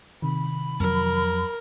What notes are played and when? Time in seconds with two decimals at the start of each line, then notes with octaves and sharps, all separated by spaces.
0.22 C3 D#3 B5
0.80 F2 F#3 A#4